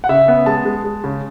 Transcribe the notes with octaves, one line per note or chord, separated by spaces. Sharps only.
F#5
C#3 E5
B3
G#3 A5
G#3
G#3
C#3